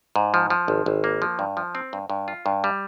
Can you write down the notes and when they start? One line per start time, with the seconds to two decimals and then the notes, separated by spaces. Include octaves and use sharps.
0.16 G#2
0.34 F3
0.50 F3
0.68 G#1
0.86 G#1
1.04 A#3
1.22 F3
1.39 G2
1.57 F3
1.75 C4
1.93 G2
2.10 G2
2.28 F4
2.46 G2
2.64 G3